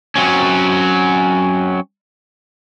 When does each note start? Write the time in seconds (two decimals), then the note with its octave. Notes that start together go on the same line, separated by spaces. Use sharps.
0.16 F#3 C4 C#4